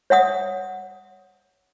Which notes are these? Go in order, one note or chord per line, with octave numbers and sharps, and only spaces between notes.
C#5 E5 F#5 D#6